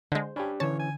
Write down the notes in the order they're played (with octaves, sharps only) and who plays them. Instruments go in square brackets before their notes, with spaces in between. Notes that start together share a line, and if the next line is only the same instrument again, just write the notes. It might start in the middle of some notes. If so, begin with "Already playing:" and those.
[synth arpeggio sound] D3 G#3 [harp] C5
[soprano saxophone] C#4 [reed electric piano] D4 G4 [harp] B5
[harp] D3 [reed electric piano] E3 C#4 [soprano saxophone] C#5 [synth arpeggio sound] A5
[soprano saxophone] G#5